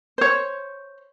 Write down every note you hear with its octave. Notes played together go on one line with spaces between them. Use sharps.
C5 C#5